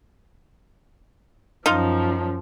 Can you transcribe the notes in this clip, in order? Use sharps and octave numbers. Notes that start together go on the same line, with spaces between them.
F#2 F3 D#4 F4